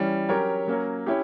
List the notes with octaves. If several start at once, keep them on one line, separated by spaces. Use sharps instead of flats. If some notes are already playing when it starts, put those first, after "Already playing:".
Already playing: E3 G3 C#4
F#3 C#4 G4 A#4 C#5
F#3 A#3 C#4
C#4 E4 G4